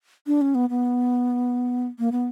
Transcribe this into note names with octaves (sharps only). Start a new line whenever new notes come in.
D4
C#4
B3
B3
A#3
B3